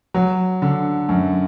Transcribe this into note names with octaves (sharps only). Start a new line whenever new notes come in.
F#3
D3
F#2